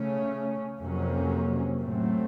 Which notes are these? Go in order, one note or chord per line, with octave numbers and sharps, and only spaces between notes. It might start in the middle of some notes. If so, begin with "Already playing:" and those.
Already playing: C#3 A3 C#4
F2 C3 F#3 A#3 C#4
A2 F#3 A3 C4